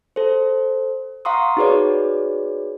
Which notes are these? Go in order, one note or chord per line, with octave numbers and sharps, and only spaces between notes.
A4 C5
F5 F#5 A#5 C6 C#6 D#6
D#4 F#4 G#4 B4 C#5 D5